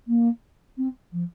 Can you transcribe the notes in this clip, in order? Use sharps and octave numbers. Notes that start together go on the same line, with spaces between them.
A#3
C4
F3